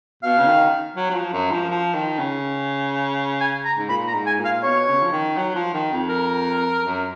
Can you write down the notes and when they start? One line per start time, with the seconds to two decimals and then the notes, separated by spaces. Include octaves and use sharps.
0.23 B2 F5
0.38 C#3
0.47 D#3
0.96 F#3
1.10 F#3
1.14 F3
1.33 F#2
1.51 F3
1.70 F3
1.94 D#3
2.19 C#3
3.41 G#5
3.65 A#5
3.78 G#2
3.89 A#2 B5
4.08 A#5
4.14 G#2
4.27 G#5
4.39 A#2
4.45 F5
4.63 B2 C#5
4.88 C#3
5.02 F3
5.12 D#3
5.37 F#3
5.55 F3
5.73 D#3
5.92 F2
6.09 A#4
6.83 F#2